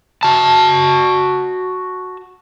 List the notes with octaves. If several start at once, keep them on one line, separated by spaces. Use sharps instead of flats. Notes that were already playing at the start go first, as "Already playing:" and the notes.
F#4 A5